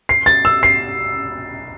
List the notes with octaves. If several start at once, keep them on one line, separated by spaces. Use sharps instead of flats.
C7
A6
E6
C7